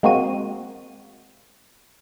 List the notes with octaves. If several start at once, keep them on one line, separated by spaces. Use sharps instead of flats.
G#3 A#3 C4 F#4 D#7